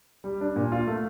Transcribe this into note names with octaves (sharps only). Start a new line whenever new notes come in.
G3
D4
A#2
F4
A3